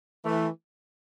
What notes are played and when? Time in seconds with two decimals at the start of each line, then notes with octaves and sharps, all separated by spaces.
0.25 E3 A3